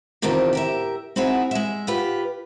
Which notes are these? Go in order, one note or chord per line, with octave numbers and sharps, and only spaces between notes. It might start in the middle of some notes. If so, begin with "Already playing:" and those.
E2 C3 D#3 F3 D4
G4 A#4 E5
C4 D#4 E4 F#4 G#4
G#3 E5
F4 G4 B4